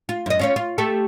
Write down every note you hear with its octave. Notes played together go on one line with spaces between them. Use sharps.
F4
F#2 D#5
C#4 F4 C#5
F4
A3 G4 A4